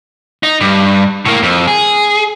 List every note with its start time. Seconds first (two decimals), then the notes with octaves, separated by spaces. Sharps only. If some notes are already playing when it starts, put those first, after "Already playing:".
0.43 D#4
0.61 G2
1.25 A2 A#3
1.43 F2
1.67 G#4